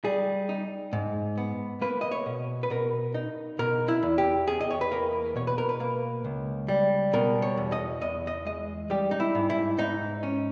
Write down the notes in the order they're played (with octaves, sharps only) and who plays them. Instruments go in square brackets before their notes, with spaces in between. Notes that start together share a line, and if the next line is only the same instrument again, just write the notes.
[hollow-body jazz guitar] G3 G#4
D#4
G#2
B3
A#3 B4
D#5
C#5
B2
B4
B2 A#4
D#4
B2 A#4
E4
E2
G4
E2 G#4
D#5
C#5
B4
A#3 A#4
B2 C#5
B4
A#4
B4
A#3
C#2
G3
B2 A#4
C#5
E2
D#5
E2 D#5
D#5
G#3 D#5
G3 G4
D#4
E4
G#2
E4
G#2 D#4
C#4